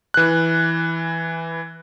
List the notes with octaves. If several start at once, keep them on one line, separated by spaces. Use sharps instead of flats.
E3 F#6